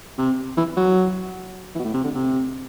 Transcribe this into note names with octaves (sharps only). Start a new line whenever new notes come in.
C3
E3
F#3
E3
B2
A2
C3
D3
C3